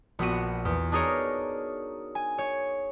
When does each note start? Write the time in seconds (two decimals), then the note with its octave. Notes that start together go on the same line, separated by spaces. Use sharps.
0.19 A#1 B3 F#4 D#7
0.65 E2
0.92 D4 D#4 G#4 A#4 C#5
2.15 G#5
2.38 C#5